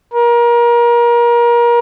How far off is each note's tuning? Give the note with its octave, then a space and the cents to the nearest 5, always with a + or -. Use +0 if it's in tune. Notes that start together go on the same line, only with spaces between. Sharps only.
A#4 +30